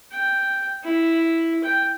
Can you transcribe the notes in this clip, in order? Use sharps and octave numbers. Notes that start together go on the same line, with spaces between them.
G5
E4
G5